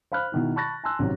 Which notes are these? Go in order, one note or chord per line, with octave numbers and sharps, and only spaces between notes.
C5 F5 B5 F6 F#6
B2 D#3 E4
A5 B5 C#6 F#6 A6 A#6
G#5 A5 C6 E6 F#6
A1 C3 D#3 F#3